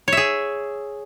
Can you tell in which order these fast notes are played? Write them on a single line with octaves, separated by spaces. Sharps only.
C#5 E5 G#4